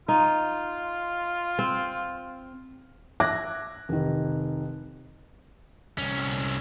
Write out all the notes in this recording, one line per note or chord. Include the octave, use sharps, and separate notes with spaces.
D#4 F4
C4
E5 D6 F#6 G#6 A#6
F1 D#3
C2 C#4